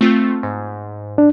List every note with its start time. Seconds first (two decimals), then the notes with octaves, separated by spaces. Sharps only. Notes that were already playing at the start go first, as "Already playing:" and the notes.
0.01 A3 C4 F4
0.43 G#2
1.18 D4